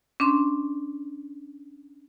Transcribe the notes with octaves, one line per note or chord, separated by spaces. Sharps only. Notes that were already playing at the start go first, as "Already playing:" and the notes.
C#4 D4 C6